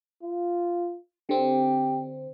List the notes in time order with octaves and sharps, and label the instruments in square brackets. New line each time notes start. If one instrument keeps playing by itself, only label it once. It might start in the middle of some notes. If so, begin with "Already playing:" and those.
[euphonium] F4
[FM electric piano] D3 C4 [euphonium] G4